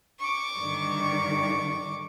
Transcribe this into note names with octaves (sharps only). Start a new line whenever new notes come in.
C#6 D6
G2 D3 D#3